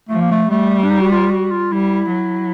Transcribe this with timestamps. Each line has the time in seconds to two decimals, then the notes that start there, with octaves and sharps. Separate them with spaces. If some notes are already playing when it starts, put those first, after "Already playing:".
0.09 F3 A3
0.21 A#3
0.31 A3
0.50 G3 A3
0.84 D4
0.90 D#4
1.01 F#4
1.12 F4
1.31 F#4
1.51 F4
1.72 G3 E4
2.12 F#3